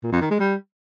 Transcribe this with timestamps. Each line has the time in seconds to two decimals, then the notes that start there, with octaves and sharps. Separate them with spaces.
0.03 A#2
0.12 F2
0.21 D#3
0.30 G#3
0.40 G3